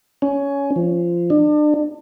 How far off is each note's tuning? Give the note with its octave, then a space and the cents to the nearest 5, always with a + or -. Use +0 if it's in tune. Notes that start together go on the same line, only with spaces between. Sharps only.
C#4 +15
F3 -15
D4 +35